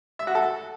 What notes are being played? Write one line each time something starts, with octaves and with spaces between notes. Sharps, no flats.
E5
F#4
A4